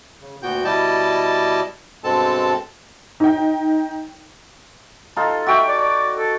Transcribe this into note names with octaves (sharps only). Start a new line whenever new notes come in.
C#3
D2 A#2 B3 F#4 G5 G6
B2 G3 E4 D5 D#5 A5
G2 B2 G#3 C4 A4 A5
D#4 G5
D#4 F4 A4
F#4 E5 G5
D5
D5
A4